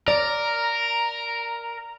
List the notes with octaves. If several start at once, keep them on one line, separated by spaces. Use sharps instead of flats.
A#4 D5 A#5